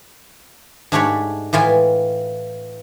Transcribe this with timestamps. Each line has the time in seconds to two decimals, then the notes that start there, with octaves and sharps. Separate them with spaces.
0.92 G#2 A3 D4 G4 C#5 B5
1.53 A2 E3 F4 G#5